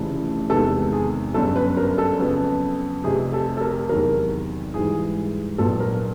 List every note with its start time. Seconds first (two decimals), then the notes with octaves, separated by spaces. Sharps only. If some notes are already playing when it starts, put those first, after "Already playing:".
Already playing: F1 F2 C#3 E3 A3
0.49 E2 C3 D#3 G#3 B3 A4
0.93 G#4
1.34 G1 F#2 D3 A4
1.56 B4
1.77 A#4
1.98 A4
2.19 F2 C#3 F#3 B3
3.04 F1 F2 C3 G#4
3.33 A4
3.57 A4
3.61 A#4
3.89 E2 C3 D#3 F#3 A#4
4.74 G#2 E3 G3 G#4
5.58 A#1 A#2 F#3 B3 A4
5.80 A#4